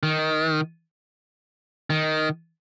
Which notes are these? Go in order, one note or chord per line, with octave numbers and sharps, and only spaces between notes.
D#3
D#3